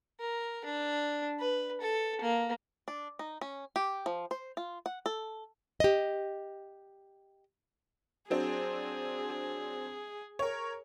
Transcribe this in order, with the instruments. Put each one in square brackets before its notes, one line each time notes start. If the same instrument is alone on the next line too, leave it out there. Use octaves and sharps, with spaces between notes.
[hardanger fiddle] A#4
D4
B4
A4
A#3
[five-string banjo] D4
D#4
C#4
G4
F3
C5
F4
F#5
A4
[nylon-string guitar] G4 D#5
[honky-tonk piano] F#3 C4 D4 [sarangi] G#4
[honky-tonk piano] A#4 C#5